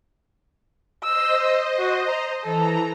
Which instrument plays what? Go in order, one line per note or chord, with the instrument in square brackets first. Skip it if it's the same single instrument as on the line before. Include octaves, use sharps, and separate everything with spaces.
[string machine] C5 D#5 [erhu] E6
[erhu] F#4
A#5
[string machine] E3 A#5 [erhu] A4